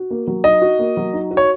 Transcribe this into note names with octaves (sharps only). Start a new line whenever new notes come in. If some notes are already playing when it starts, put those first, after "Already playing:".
Already playing: F#4
A#3
F#3
D#4 D#5
F#4
A#3
F#3
D#4
F#4
C#5